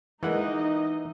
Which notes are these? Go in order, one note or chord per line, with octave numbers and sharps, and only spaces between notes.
E3 G#3 A#3 D#4 D#5 F#5